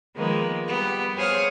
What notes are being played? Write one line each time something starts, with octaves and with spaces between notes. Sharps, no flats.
D#3 F3 G#3 A#3 B3
G3 B3 G4
G#4 C5 C#5 F5 D#6 F6